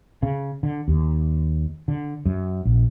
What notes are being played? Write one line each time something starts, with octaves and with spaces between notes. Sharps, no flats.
C#3
D3
D#2
D3
F#2
A#1